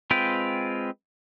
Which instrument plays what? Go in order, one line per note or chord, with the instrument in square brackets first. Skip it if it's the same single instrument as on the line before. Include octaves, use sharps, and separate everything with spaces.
[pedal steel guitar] G#3 C4 F4 B4 G5